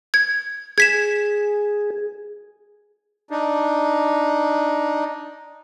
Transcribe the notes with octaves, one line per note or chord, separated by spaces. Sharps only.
G#6
G#4 G#6 B6 E7
D4 D#4